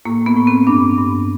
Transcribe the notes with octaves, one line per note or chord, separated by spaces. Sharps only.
A2 A#3
B3
A2
C4
G2 D4
G2